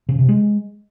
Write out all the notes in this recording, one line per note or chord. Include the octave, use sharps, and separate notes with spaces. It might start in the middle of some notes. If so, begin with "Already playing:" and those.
C#3
C3
G#3